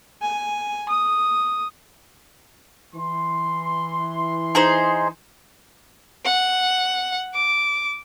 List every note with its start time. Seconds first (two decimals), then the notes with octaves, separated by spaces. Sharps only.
0.22 G#5
0.89 D#6
2.94 E3 C6
4.55 D#4 G#4 C5
6.25 F#5
7.34 D6